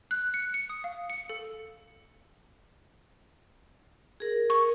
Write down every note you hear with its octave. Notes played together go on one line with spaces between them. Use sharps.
F#6
C#7
C#7
D#6
F5
C#7
A4
G#4 A#4
C#6